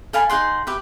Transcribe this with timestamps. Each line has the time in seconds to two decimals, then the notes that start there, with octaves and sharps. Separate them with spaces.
0.13 A4 F5 G#5 B5
0.30 D#4 G#4 F#5 C6
0.67 G4 B4 E5